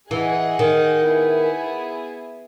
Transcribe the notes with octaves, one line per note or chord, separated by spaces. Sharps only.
E3 G#4 D#5 F#5
D#3
B3 E4 G#4